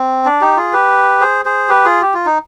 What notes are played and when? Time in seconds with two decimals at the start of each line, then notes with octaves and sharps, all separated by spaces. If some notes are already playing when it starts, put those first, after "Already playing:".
Already playing: C4
0.26 D4
0.41 D#4 G4
0.57 F4 G#4
0.73 G4 B4
1.21 G#4 C5
1.45 G#4 C5
1.69 G4 B4
1.85 F4 G#4
2.02 G4
2.14 F4
2.26 D#4